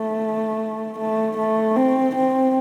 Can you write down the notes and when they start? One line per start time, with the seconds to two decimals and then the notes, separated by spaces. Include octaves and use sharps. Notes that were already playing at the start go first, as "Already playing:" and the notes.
Already playing: A3
0.99 A3
1.38 A3
1.76 C4
2.16 C4